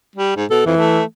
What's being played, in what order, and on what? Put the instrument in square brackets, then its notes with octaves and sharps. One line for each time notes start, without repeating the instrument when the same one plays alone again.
[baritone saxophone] G3
G#2
[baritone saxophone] B2 [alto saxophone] A4
[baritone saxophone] F2 [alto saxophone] E3
[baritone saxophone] A3